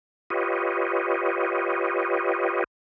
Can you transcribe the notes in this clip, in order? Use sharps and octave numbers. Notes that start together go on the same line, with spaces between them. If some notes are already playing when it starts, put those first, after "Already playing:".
F4 G4 B4 C#5 D#5